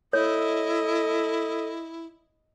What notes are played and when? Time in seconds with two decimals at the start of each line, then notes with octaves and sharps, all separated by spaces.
0.13 E4 A4 C#5 D#5